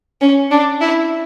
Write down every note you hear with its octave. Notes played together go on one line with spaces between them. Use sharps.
C#4
D4
E4